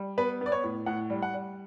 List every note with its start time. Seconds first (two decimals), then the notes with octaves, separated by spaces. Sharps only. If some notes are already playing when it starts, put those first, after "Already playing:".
Already playing: G3
0.18 B3 B4
0.41 B3 D5
0.52 C#5
0.64 A2
0.86 A2 F#5
1.10 G3
1.22 F#5
1.34 G3